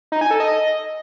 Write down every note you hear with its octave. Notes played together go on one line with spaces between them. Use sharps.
D#4
G#5
A4
D#5